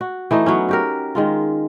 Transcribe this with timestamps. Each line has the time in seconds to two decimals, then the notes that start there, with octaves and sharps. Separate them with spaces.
0.01 F#4
0.31 E3 A3 D#4
0.46 F#3 B3 C#4
0.69 F#4 G4 A#4
1.15 D#3 G#3 F4